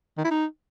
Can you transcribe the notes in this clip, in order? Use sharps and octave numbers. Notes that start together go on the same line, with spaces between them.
D#3
E4
D#4